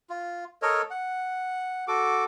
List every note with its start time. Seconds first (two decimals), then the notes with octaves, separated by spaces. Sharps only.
0.10 F4
0.62 A4 A#4 C#5 D#5
0.90 F#5
1.88 F#4 A4 D6